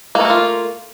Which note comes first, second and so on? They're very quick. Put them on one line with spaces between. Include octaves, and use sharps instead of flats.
A#3 A3 A#4 F4